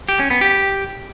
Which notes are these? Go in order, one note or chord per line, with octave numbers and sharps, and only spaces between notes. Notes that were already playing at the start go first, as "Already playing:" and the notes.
G4
C#4
B3
G4